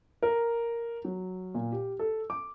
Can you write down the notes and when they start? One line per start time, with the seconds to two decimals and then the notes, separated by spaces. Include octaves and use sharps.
0.23 A#4
1.05 F#3
1.54 A#2
1.72 G4
1.99 A4
2.30 D6